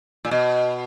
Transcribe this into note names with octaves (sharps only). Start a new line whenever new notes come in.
A#2
B2